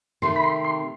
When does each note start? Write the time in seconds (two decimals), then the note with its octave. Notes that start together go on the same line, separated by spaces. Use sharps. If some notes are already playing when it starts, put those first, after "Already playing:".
0.22 C3 D#3 A3 C6
0.36 B5
0.44 C6
0.65 C6